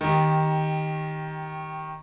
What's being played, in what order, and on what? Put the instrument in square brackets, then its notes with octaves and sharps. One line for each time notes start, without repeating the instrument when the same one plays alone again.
[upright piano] D#3 G4